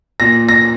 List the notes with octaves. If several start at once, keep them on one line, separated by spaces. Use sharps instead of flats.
A#2 A#6
A#6